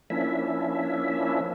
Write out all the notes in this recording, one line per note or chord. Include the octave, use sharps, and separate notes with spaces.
F3 A#3 C#4 D4 E4 E5